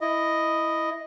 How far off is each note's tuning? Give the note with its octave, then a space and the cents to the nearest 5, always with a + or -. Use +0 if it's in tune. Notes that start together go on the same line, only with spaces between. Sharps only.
E4 +0 D#5 +0